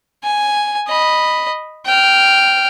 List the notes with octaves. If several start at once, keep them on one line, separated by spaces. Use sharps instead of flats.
G#5
D#5 B5
G5 F6